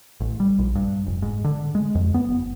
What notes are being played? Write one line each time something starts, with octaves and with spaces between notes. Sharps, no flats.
A1
G3
A#1
G2
F1
G#2
D3
G#3
F2
B3
F#1